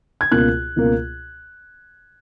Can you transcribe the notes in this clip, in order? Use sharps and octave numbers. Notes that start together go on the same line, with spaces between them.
G#6
C#2 B2 A#3 F#6
C#2 B2 A#3